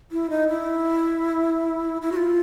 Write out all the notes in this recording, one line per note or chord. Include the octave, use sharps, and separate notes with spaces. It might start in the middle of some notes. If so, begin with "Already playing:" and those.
E4
D#4
E4
E4
F#4
F4